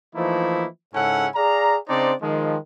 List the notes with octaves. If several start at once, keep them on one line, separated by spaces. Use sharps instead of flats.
E3 F3 A3 A#3 D#4 E4
G#2 C#3 C#4 E4 A4 F#5
G#4 D5 F5 A#5
C#3 C4 D4 D#4 C5 D5
D#3 F3 G#3